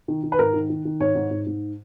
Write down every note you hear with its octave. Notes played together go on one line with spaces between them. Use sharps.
D#3
D#3
B4
G#2 A#4
D#3
D#3
D#3
G#2 C#5
G#2
G#2
G#2